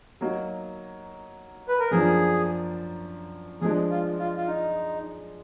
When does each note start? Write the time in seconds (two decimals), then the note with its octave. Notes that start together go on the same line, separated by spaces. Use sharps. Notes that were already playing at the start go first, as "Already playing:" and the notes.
0.21 F#3 A#3 D#4
1.68 B4
1.80 A#4
1.91 F#2 F3 A#3 D4 G#4
3.62 F3 G#3 D4 G#4
3.90 F4
4.19 F4
4.37 F4
4.47 D#4